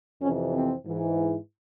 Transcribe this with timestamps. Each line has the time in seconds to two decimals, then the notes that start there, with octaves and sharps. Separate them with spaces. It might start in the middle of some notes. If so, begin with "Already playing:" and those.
0.21 F2 C3 E3 C#4
0.53 C4
0.85 G#2 E3